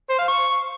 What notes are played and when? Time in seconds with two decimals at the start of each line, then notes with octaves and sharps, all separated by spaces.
0.10 C5
0.19 F5
0.28 C#6